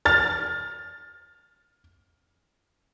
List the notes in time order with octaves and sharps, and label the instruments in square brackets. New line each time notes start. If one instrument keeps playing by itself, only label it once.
[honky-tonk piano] F6 A6